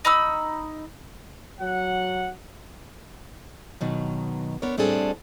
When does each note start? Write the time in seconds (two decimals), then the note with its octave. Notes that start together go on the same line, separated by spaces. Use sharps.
0.05 D#4 B5 E6
1.61 F#3 F#5
3.81 B2 D#3 F#3
4.62 B3 D4 A#4 C#5
4.78 A2 G3 C4 D4 G#4 A4